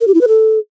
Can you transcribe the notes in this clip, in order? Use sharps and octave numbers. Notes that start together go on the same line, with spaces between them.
A#4
G4
E4
B4
A4